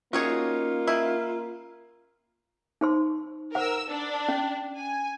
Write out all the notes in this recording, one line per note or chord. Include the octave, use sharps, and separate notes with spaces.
A#3 C#4 D#4 F4 F#4 G#4 C#5
D#3 E4
D#4 C5 C6
A#4 C5 F#5 E6
D4
C#4
G#5